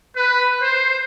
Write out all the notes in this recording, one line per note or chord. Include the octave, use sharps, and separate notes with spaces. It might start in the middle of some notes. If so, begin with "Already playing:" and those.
B4
C5